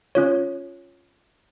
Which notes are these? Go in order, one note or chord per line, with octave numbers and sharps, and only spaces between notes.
C#4 F4 C#5